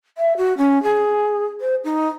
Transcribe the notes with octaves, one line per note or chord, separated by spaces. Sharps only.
E5
F#4
C#4
G#4
C5
D#4